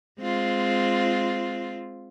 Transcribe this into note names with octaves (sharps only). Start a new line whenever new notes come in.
G#3 C4 F4